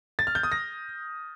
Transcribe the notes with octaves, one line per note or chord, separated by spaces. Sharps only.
A6
F6
G6
D#6
A#6